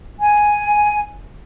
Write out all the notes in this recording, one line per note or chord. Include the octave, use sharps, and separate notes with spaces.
G#5